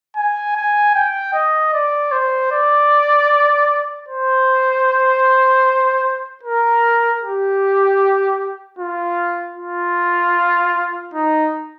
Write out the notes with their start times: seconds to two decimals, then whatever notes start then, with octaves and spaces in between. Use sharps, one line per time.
0.17 G#5
0.56 G#5
0.95 G5
1.34 D#5
1.74 D5
2.12 C5
2.52 D5
4.09 C5
6.43 A#4
7.22 G4
8.79 F4
9.57 F4
11.14 D#4